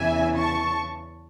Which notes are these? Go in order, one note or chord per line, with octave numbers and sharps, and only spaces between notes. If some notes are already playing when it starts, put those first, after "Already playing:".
Already playing: E2 C#3 E3 E5 G#5
A5 C#6